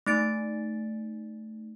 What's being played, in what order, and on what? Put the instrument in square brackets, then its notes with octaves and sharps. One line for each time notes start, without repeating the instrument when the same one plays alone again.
[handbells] A3 D#4 A6 D7